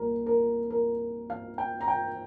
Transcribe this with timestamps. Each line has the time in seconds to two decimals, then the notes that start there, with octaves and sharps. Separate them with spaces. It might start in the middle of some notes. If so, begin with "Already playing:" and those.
Already playing: C2 A#2 A#4
0.26 A#4
0.70 A#4
1.30 F5
1.58 G5
1.81 A#5
1.88 G5